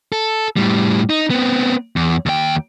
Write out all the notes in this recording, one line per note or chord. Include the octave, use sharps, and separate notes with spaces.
A4
A2 G3
D#4
B3 C4
E2
D#2 G5